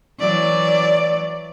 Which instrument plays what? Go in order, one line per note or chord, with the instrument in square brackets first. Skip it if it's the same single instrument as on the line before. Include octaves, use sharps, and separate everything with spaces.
[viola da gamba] E3 F#3 D5